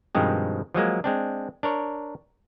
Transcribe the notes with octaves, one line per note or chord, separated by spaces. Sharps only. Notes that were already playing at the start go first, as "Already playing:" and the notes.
G2 B2 D#3 F3 G#3 C4
F3 F#3 G#3 A#3
G#3 C4 D4
D4 A#4 C#5